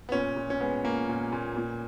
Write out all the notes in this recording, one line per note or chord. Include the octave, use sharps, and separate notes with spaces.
B3
A#2 C#4
A#2
C#4
G#3 B3
A#3 C#4
A#2
A#2
A#2